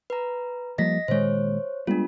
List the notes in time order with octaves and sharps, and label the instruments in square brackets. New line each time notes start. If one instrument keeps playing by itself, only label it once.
[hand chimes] B4 A#5
[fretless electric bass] F3 G3 A#3 [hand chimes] D#5 A#6 B6
[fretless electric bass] A#2 D#3 G#3 [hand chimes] C5 C#5
[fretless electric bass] G3 G#3 B3 [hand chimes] D4 F4